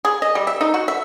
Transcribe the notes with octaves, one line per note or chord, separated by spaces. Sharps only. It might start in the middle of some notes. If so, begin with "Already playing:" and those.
G#4
D#5
G3
E5
D#4
F#4
E5